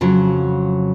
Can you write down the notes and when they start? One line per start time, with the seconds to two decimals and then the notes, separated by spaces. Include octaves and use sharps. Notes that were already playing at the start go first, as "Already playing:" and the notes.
0.01 F2 C#3 F#3